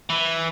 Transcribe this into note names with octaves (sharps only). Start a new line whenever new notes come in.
E3